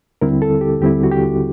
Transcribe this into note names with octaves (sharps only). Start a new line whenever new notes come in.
D#2 D3 G3 C4 E4 A#4
A4
G4
D#2 D3 G3 C4 E4 G4
F#4
G4